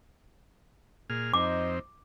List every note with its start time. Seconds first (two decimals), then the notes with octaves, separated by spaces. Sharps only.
1.10 A#2 G#4 F6
1.34 F2 C4 D#4 C5 D#5 D6